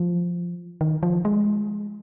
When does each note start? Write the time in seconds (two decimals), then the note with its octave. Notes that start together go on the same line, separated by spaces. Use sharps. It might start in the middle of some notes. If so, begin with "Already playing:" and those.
Already playing: F3
0.81 D#3
1.03 F3
1.25 G#3